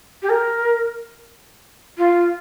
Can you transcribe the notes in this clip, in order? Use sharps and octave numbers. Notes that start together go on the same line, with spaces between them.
G4
A#4
F4